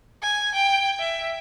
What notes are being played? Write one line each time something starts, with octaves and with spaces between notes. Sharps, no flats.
G#5
G5
E5